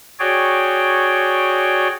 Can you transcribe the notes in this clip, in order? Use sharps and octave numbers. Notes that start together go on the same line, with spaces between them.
F#4 G#4 C#5 D5 G5